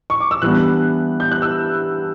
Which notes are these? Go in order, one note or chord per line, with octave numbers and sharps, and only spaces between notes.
C#6
D6
E6
E3 G3 B3 D4 F#6
G6
F#6
E6